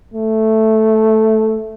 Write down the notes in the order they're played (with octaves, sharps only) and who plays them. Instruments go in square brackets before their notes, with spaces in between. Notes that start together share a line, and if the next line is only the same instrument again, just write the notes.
[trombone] A3